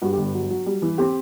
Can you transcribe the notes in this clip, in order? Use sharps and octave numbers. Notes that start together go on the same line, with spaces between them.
G2 F#4
G4
G1
F#3
F#3
G3
E3
C4 G4